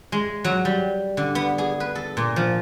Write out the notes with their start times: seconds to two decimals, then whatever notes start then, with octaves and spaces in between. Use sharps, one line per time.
0.12 G#3
0.44 F#3
0.65 G3
1.17 D3
1.35 B3
1.58 G#4
1.80 B4
1.95 A4
2.17 A#2
2.36 F3